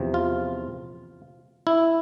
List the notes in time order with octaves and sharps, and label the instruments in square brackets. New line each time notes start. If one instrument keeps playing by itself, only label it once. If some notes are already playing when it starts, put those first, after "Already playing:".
Already playing: [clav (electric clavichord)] E2 C3 F3
F4
E4